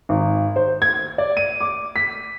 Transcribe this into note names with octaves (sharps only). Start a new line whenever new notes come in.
G#1
C5
G#6
D5
D#7
D6
B6